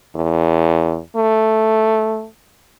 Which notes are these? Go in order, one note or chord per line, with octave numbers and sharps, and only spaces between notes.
E2
A3